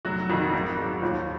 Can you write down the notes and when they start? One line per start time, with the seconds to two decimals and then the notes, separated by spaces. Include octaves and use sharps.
0.05 F1 F#3 F#4
0.30 F2 D#3 F#3
0.53 G#1
0.78 G#2 F#3
1.02 D#2 F3 F4